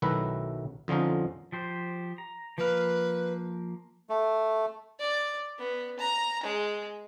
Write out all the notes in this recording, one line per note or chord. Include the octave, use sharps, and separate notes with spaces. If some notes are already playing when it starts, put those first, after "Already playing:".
B1 D#3 F#3 A3 E4 B4
F2 D3 F3 C#4 D#4
F3 G4 C5
A#5
F3 A#3 B4 F5
A3
D5
B3
A#5
G#3